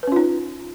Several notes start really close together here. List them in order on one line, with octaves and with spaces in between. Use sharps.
B4 C#4 F4 D#4